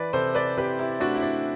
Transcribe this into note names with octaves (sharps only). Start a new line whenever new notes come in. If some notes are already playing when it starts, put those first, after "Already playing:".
Already playing: E3 B4 D5
C3 A4 C5
B4 D5
C3 G4 B4
E4 G4
A3 D4 F#4
E4
D4